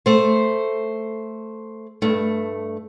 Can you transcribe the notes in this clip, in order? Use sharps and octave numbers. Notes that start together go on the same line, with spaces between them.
A3 C5
G2 A3